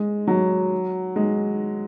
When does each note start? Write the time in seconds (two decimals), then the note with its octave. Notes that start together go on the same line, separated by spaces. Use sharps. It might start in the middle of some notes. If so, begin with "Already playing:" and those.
Already playing: G#3
0.27 F#3
1.16 G#3